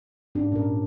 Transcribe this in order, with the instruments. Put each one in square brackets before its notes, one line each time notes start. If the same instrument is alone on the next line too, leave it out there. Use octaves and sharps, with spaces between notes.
[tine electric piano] G#2 [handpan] C#4 D4 G4
[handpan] A#2 C#4 A#4